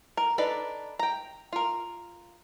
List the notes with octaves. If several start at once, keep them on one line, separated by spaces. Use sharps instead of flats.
A#4
D4 D#4 A4 B4 D5
G5 A#5
F4 A#4